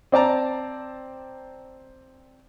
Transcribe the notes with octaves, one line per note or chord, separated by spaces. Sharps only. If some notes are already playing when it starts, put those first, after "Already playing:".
C4 D5 A5 A#5